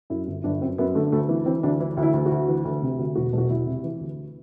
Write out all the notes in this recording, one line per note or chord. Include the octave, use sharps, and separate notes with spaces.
F#2 E4
G1
G1 D4
F#2 C4
F#2 B3
D3 A3
D2 A3
E3 B3
E3 C4
D2 D4
E3 E4
D2
E4
D2
F#4
D2
E3
D2
C3
D2
E1 F#4
E1
F#4
E1 E4
C3
E3
D2